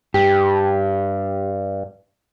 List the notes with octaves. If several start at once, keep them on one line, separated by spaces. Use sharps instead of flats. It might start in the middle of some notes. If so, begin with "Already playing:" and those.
G2 G4